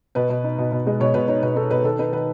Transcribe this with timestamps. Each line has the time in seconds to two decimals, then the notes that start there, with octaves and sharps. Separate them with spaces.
0.15 B2 B4
0.29 B2
0.44 D#4
0.58 B2
0.72 B2
0.87 G#3
1.00 B2 C#5
1.14 B2 B4
1.28 D#4 C#5
1.42 B2 B4
1.56 D#4 A4
1.71 B2 B4
1.84 D#3 A4
1.99 D#4 B4
2.12 D#3 B4